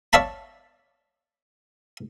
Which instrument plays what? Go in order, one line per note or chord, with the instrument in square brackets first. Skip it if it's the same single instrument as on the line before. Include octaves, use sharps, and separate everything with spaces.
[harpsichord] C#5 D5 E5 F5 A5 B5